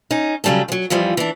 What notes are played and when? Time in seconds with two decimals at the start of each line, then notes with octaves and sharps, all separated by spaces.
0.11 C#4 D#4
0.44 C#3 F#3 G3 C#4 A4
0.68 F3 F#3
0.90 F2 E3 F3 G3
1.17 E3 D4